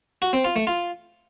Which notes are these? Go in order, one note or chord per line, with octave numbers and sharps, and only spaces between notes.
F#4
C4
F4
A3
F4